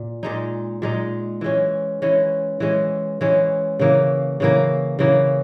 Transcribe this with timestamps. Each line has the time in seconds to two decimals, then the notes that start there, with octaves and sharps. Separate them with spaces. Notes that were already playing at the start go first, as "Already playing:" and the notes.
Already playing: A#2
0.23 A#2 G#3 D#4
0.82 A#2 G#3 D#4
1.41 E3 G#3 C#4
2.02 E3 G#3 C#4
2.60 E3 G#3 C#4
3.21 E3 G#3 C#4
3.79 C#3 E3 A#3
4.40 C#3 E3 A#3
4.99 C#3 E3 A#3